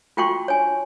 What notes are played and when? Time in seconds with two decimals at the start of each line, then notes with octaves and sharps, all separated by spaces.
0.17 F4 F#4 G5 A5 C6 C#6
0.48 C#5 G#5